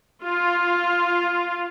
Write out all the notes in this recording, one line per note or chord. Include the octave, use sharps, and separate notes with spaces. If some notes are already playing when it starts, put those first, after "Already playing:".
F4